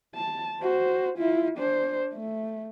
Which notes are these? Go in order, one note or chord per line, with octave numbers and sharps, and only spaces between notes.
A5
F#4 C5
E4 F4
D4 C5
A3